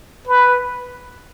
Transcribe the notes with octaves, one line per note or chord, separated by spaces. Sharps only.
B4